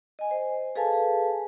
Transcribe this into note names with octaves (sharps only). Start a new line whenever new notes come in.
D#5 G#5
C5
G#4 A4 B4 F5 G#5 A5